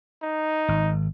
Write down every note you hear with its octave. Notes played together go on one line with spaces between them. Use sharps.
D#4
G#1